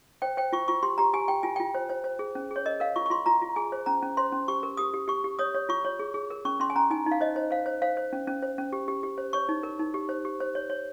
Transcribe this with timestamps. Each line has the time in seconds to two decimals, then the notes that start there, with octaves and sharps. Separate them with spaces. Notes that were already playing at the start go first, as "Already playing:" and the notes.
0.22 C5 G5
0.37 C5 G5
0.53 F4 C#6
0.68 F4 C#6
0.83 G4 C6
0.98 G4 A#5
1.13 G4 G#5
1.28 G4 G5
1.43 F4 G#5
1.56 F4 G5
1.75 C5
1.89 C5
2.04 C5
2.19 G#4
2.35 C#4
2.51 G#4
2.56 C#5
2.66 A#4 D#5
2.80 A#4 F5
2.96 F4 C#6
3.06 C#6
3.10 F4 C6
3.26 F4 A#5
3.42 F4
3.56 G#4 G#5
3.72 C5
3.86 C#4 A#5
4.02 C#4
4.17 C5 C6
4.32 C#4
4.48 G4 C#6
4.63 A#4
4.77 G4 D#6
4.94 G4
5.08 G4 C#6
5.24 G4
5.39 C#5 D#6
5.54 C#5
5.69 F4 C#6
5.85 C#5
5.99 G#4
6.14 G#4
6.30 A#4
6.45 C#4 C#6
6.60 C#4 C6
6.70 G#5
6.76 C#4 A#5
6.90 D#4 G#5
7.06 D#4
7.11 F5
7.21 C5 D#5
7.36 C5
7.51 C5 F5
7.66 C5
7.82 C5 F5
7.97 C5
8.13 C#4
8.27 C#4
8.43 C5
8.58 C#4
8.73 G4
8.88 G4
9.03 G4
9.18 C5
9.33 C#5 C#6
9.49 D#4
9.63 A#4
9.79 D#4
9.94 G4
10.09 C5
10.25 G4
10.40 C5
10.55 C#5
10.70 C#5